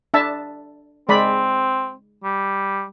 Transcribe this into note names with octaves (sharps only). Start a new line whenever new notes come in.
D4 E5 A5
G#3 C4 D5 B5
G3